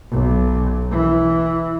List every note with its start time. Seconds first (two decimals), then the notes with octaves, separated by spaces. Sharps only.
0.10 B1
0.91 E3